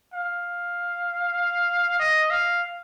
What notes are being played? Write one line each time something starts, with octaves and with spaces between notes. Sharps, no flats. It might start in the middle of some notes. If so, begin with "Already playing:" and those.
F5
D#5
F5